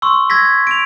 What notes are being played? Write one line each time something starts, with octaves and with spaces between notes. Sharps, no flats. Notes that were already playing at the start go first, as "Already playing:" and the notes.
C6 C#6 E6
E6 G#6 A#6 B6
D7 F7